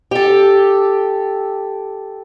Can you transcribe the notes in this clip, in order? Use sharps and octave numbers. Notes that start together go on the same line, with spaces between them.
G4 A4